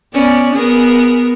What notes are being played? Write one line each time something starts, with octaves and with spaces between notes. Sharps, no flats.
B3 C#4 D5
B3 G#4 A#4